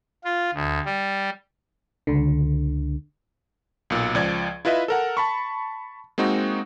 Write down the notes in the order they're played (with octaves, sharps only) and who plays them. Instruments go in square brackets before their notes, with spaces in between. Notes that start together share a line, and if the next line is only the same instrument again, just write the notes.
[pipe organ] F4
D2
G3
[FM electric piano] C#2 D3
[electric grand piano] B1 A#2
C#2 F3 D5 G#6
E4 F4 B4 D#5 E5
A4 A#4 F#5
A5 B5 C#6
G#3 A#3 C4 D#4 F#4